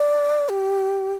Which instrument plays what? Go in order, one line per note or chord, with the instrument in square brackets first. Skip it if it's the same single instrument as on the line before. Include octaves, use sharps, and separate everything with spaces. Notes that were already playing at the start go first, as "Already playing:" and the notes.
Already playing: [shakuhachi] D5
G4